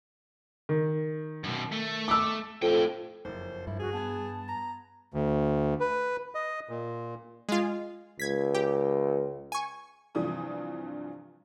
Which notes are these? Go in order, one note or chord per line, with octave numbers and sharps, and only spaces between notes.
D#3
F#2 B2
A3
D6 E6
F2 A2 G5
F#1 F2 C5
G2 E4
F#4 G#4
B3 A5 G#6
A#5
D2
B4
D#5
A#2
G#3 F4
C#2 G#6 B6
G4
G#5 C#6
G2 C3 E3 F3 D4 D#6